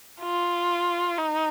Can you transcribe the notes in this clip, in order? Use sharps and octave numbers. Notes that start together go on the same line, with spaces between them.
F4
D#4